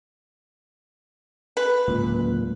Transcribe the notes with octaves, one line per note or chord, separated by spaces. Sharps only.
B4
D1 C#2 A#2